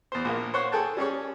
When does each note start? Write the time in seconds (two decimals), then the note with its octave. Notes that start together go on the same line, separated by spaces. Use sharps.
0.12 E2 C5
0.25 A#1 A#3
0.54 C5 C#5 F#5
0.72 G#4 A4 G5 A5
0.97 G3 C#4 G#4 C#5